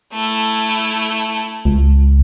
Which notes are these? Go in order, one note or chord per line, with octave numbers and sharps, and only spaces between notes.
A3 E4
C#2